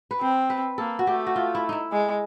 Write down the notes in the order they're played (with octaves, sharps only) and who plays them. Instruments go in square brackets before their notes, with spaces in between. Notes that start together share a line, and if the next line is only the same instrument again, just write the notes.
[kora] B4
[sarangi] C4 [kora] C5
[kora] B4
[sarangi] A#3 [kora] A4
[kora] F#4
[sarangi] A3 [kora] G4
[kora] F#4
F4
E4
D#4 E4
[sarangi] G#3